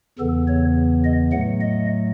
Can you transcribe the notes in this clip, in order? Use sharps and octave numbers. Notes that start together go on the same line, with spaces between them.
E2 C#3 E3 B3 A4
C#5
D#5
A2 F#3 A3 F#5
D#5